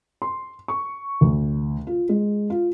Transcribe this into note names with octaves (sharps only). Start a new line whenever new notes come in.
C6
C#6
D2
F4
G#3
F4